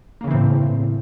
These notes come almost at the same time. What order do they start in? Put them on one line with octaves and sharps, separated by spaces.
A#3 C#3 E3 C4 A2